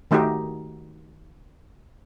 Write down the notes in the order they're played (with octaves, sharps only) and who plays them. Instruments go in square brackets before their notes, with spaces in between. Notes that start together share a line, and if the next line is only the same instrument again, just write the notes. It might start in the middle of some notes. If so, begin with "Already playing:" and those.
[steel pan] D#3 A3 D#4 F#4 G4